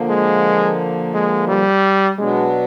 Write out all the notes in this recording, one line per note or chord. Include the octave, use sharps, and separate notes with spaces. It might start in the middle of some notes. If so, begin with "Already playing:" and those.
Already playing: D3 F3 A#3
G#3
G#3
G3
B2 F#3 G#3 B3 D4